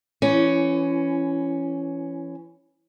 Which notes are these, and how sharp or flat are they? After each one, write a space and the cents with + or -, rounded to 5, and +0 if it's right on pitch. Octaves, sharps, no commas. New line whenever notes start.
E3 +30 C#4 +0